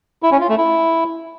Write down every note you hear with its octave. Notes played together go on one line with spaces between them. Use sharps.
E4
C#4
F4
A3
E4